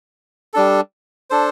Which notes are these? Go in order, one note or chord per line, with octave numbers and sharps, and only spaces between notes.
G3 D4 A4
D4 A4 C5